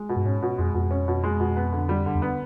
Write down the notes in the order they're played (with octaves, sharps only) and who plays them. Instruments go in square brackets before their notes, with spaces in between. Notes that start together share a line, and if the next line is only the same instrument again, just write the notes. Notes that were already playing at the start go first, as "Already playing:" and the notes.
Already playing: [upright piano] G#3
B2
[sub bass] G2
[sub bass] G#2 [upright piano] C#4
[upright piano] B2
[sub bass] F2 [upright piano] G#3
[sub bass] F2 [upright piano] B2
[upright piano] C#4
B2
G#3
B2
B3
D3
G3
D3
[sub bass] E2
[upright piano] B3